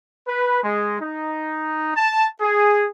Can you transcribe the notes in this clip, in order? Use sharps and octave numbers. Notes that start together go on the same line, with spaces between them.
B4
G#3
D#4
A5
G#4